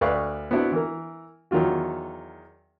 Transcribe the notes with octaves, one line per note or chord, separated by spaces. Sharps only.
D2 B4 D5 F5 C#6
B3 C4 D4 E4 F#4
E3 A#4
E2 D#3 F#3 F4 F#4